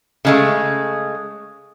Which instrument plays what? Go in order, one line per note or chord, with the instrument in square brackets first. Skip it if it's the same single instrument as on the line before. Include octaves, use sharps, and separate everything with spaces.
[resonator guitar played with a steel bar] C#3 G#3 A3